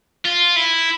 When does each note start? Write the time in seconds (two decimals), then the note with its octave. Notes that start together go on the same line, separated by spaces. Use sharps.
0.25 F4
0.56 E4